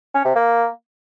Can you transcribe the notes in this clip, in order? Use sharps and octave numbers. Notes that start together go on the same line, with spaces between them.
C#4
C3
A#3